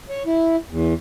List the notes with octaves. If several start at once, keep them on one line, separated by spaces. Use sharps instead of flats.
C#5
E4
E2